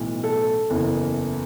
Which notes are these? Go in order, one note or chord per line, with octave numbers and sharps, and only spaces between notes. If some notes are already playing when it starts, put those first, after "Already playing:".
Already playing: B1 A2 E3
A4
F#1 E2 E3